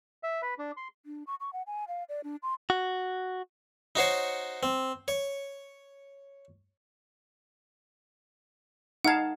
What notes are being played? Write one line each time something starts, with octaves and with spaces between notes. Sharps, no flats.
E5
B4
D4
C6
D4
C#6
C#6
F#5
G#5
F5
D5
D4
C6
F#4
D#4 F#4 C5 C#5
C4
C#5
D#4 F5 F#5 A5 G#6